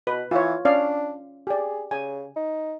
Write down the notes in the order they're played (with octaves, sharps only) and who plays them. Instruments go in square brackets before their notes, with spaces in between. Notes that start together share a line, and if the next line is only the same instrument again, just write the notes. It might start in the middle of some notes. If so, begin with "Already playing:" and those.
[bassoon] B2 [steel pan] B4
[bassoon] E3 [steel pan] F4 C#5
[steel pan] C#4 D5 F5 [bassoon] D4
[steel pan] G4 D5 [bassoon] G#4
[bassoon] C#3 [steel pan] G#5
[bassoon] D#4